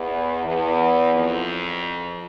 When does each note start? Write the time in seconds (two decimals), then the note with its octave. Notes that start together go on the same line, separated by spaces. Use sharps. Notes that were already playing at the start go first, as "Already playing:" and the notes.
Already playing: E2
0.44 E2
1.13 F2